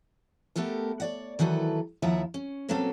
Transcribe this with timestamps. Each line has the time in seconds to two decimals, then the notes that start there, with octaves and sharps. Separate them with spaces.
0.56 A3 B3 G4 A4 A#4
1.00 C#5 D5 F#5
1.39 D#3 E3 F#3 A4 B4
2.02 D#2 F3 E4 E5 F#5 A#5
2.34 C#4
2.69 B2 F#3 A#3 C4 C#4 A4